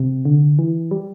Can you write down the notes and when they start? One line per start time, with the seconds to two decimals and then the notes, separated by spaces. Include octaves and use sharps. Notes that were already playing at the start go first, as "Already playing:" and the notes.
Already playing: C3
0.25 D3
0.59 E3
0.91 G3